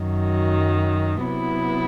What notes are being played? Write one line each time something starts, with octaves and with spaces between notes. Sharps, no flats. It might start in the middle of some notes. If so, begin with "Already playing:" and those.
Already playing: F#2 D#3 F#3
C3 F#3 B3 E4